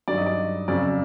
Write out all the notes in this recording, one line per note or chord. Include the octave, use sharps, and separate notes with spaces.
G2 D#3 F#3 D5
D#5
D5
F2 C#3 F#3 D5